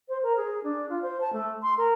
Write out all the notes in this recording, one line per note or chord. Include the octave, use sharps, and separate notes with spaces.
C5
A#4
G#4
D4
F4
C5
A5
A3
C6
A#4